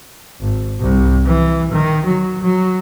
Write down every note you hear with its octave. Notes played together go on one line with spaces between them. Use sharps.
G#1
C2
E3
D#3
F#3
F#3